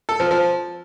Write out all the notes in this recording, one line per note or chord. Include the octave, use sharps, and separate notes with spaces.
A4
F3
F3